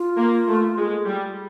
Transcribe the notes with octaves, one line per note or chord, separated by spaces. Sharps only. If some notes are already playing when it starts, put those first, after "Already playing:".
Already playing: F4
A#3
A3
G#3
G3